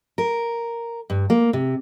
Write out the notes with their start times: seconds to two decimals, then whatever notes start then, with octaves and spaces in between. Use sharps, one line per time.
0.18 A#4
1.10 G2
1.30 A#3
1.53 C3